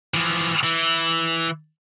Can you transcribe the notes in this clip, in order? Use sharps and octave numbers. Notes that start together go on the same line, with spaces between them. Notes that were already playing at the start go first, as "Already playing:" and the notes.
E3 F3
E3 E4